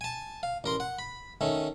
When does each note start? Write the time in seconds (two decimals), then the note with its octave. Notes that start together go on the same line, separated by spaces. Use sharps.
0.01 G#5 A5
0.43 F5
0.64 A1 A#4 C6
0.80 F#5
0.99 B5
1.41 D#3 A3 C#4